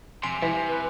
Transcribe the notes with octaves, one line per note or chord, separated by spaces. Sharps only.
C3 G#5 C6 D7 F7
C3 E3
B4